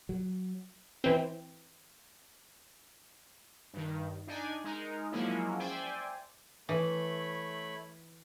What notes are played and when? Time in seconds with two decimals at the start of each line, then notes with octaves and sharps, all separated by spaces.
0.09 F#3
1.04 E3 C4
3.73 G2 D#3
4.27 D4 D#4 D5 G#5
4.64 G#3 D#4 A#4
5.12 F3 F#3 G#3 A#3 C#4 E4
5.59 C5 D5 E5 G5 G#5
6.69 E3 A3 C#5 B5